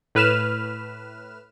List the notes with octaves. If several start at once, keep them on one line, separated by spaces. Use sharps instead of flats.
A2 B4 F6 E7